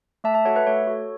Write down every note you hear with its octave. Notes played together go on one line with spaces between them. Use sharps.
A3 E5 A5
E5 A5
F#4 A4 C#5 F#5
B4 E5
A3 C#5
F#4 A4